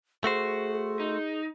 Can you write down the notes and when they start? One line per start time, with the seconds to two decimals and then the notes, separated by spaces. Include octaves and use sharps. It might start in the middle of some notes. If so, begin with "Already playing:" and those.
0.24 A3 F#4 G#4 C5
1.00 D#4